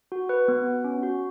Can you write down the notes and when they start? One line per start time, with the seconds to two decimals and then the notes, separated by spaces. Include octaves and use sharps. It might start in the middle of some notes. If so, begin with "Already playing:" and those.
0.12 F#4
0.29 B4
0.48 B3
0.67 F#4
0.84 C#4
1.03 F#4